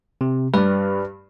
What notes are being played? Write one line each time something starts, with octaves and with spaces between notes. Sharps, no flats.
C3
G2 B4 D5